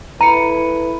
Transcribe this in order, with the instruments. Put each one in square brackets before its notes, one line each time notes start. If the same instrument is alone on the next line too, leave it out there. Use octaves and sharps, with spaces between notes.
[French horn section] E4 A4 B4 [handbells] A#5 [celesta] B5 C#7 D#7